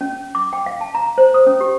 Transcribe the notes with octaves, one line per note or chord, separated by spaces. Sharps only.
C#4
D6
G5
F5
A5
A#5
C5
D#6
C#4
G4